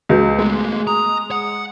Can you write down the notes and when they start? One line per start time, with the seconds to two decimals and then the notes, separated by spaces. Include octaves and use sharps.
0.09 C#2 F#4 B4 G6
0.39 G#3 A3 B3
0.87 A#5 D#6
1.31 F#5